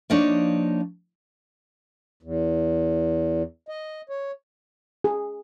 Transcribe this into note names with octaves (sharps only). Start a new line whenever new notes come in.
F3 A#3 D4 D#4 C#5
E2
D#5
C#5
G#4